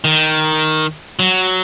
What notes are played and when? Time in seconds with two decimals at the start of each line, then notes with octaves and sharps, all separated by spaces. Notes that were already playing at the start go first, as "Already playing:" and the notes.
0.05 D#3
1.19 F#3